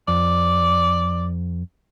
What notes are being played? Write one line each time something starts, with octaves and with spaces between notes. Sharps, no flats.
F2 D5